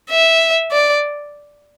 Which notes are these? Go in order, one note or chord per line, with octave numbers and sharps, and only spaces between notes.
E5
D5